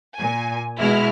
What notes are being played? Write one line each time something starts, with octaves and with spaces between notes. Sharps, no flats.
A#2 G#5
B2 G#3 E4 F6